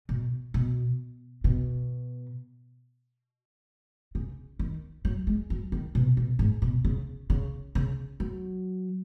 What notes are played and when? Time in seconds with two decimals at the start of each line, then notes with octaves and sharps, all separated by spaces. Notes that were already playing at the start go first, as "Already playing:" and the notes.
0.09 B2
0.54 B2
1.44 B2
4.15 C#3
4.59 D#3
5.05 F#3
5.27 G#3
5.50 F#3
5.72 D#3
5.95 B2
6.17 B2
6.39 G#2
6.62 B2
6.85 C#3
7.30 C#3
7.75 C#3
8.20 F#3